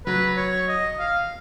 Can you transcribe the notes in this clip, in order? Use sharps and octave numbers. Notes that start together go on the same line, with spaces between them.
F#3 B4
C#5
D#5
F5